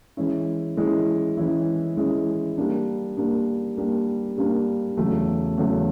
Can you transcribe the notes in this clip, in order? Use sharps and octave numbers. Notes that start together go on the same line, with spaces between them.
E3 G#3 C#4 E4
E3 G#3 C#4 E4
E3 G#3 C#4 E4
E3 G#3 C#4 E4
G3 A#3 D4
G3 A#3 D4
G3 A#3 D4
G3 A#3 D4
E2 C#3 F#3 A3
E2 C#3 F#3 A3